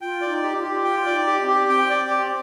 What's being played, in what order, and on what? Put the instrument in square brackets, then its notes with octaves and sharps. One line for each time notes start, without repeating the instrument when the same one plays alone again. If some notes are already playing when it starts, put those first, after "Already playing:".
[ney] F4 [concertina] G5
[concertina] D5
[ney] D#4
[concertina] G4
[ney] F4
[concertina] G4
[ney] F4 [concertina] G5
[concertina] D5
[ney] D#4
[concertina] G4
[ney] C4
[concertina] G4
[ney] C4 [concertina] G5
[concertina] D5
G4